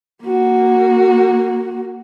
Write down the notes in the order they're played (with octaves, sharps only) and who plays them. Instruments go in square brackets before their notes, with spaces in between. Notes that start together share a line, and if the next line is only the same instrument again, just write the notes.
[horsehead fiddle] A#3 F#4